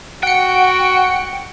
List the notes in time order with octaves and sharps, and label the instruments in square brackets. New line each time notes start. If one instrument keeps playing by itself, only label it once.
[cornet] F#4 [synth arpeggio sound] F#5 C#7 [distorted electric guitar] G5